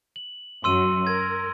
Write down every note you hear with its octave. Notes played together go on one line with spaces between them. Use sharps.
F#7
F#2 F#4 C6 E6 D#7
A#4 G#6